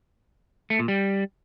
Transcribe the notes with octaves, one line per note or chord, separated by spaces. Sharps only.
A3
A#2
G3